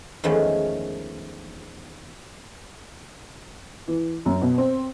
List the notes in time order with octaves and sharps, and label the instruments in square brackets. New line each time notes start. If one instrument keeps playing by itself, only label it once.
[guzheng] E2 D#3 F3 G#3 A3 C#4
[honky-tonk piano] E3
F#2
B2
C4